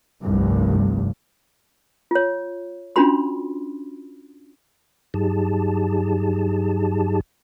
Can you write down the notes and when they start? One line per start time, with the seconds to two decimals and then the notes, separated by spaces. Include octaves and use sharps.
0.22 F1 C2 G2
2.11 F4 C#5
2.96 C#4 D4 F4 F#4 B5 C6
5.14 G2 F#3 D#4 G4 G#4 A5